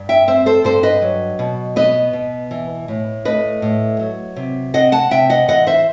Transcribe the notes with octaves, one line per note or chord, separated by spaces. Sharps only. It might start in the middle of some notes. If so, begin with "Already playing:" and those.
Already playing: G2
E5 G5
C4 C5 E5
A4 C5
G2 A4 C5
B4 D#5
F#3
B2
B3 B4 D#5
B2
E3
A2
A3 B4 D#5
A2
F#3
C3
C4 D#5 F#5
F#5 A5
C3 E5 G5
D#5 F#5
E3 D#5 F#5
C5 E5